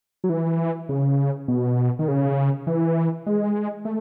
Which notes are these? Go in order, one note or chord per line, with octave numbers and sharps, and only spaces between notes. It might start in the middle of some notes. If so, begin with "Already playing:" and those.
F#3
E3
C#3
B2
D#3
C#3
E3
G#3
A3